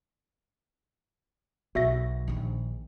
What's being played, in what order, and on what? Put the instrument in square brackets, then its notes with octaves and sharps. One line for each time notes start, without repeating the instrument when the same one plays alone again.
[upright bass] B1 [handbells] F#4 E5 A#6
[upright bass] A#1 D#3